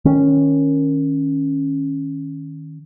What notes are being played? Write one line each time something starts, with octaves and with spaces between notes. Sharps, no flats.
D#3 C#4